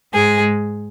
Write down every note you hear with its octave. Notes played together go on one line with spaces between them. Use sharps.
G#2 G#3 G#4